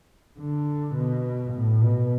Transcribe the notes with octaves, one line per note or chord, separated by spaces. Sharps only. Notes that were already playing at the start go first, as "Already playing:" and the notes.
D3
B2
A2
B2